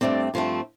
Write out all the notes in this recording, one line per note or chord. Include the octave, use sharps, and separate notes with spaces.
G2 F3 A3 C4 D5
G2 F3 A3 C4